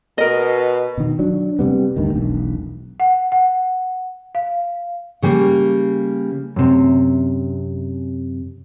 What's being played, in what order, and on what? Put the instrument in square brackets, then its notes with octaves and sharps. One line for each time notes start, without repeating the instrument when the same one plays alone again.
[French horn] B2 [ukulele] A#4 D#5
[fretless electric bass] B2 D#3
F#3 D4
C3 G3 B3
D2 G2 D#3
E1 B1
[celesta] F#5
F#5
F5
[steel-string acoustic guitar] C#3 G3 A#3
[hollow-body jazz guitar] F#2 C3